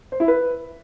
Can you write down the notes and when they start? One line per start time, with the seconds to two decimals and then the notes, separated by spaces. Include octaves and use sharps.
0.12 C5
0.20 E4
0.28 B4